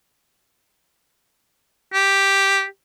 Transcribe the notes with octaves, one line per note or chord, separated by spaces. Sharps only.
G4